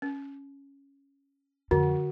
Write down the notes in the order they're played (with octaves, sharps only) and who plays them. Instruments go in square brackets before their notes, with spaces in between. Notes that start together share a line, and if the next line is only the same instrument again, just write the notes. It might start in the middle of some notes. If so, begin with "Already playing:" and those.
[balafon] C#4
[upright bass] F2 [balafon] D3 [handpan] F#4